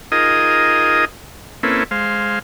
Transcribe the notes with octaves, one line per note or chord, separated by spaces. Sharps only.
D#4 F4 G#4 A#4 D#5 D#6
A#3 C4 C#4 E4 A4 B4
G#3 C5 F5